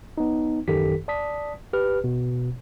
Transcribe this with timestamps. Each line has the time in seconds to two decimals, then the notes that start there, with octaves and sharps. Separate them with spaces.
0.18 B3 D#4
0.68 A1 F#2 D#3 G4 A4 B6
1.08 D5 A5 D#6 B6
1.73 G4 B4 F6
2.04 B2